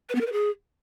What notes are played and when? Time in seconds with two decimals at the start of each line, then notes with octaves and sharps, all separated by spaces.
0.09 B4
0.15 B3
0.21 A#4
0.26 B4
0.32 G#4